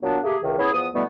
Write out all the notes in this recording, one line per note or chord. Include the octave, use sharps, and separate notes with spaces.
A#2 F#3 B3 D4
A3 A#3 G4 G#4
C#2 C3 D#3
B3 C#4 E4 G#4
E2 F3 B3 D#6
B2 D3 G3 A3 B3 E4